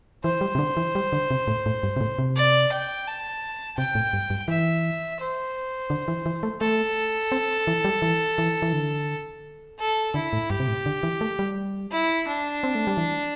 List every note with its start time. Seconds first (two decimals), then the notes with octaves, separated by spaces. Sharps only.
0.24 E3 C5
0.41 G3
0.55 C3
0.59 D3
0.77 E3
0.95 G3
1.13 D3
1.31 C3
1.48 A2
1.66 A2
1.83 G2
1.96 C3
2.01 A2
2.18 C3
2.36 D5
2.72 G5
3.07 A5
3.77 C3 G5
3.95 A2
4.13 G2
4.30 G2
4.48 E3 E5
5.20 C5
5.90 D3
6.08 E3
6.26 E3
6.43 A3
6.61 A3 A4
7.32 C4
7.67 E3
7.85 G3
8.02 E3
8.38 E3
8.62 E3
8.73 D3
9.79 A4
10.14 D3 E4
10.33 A2
10.50 G2 G4
10.60 C3
10.68 A2
10.86 D3
11.03 E3
11.21 A3
11.39 G3
11.91 E4
12.28 D4
12.63 C4
12.75 A3
12.87 G3
12.97 E3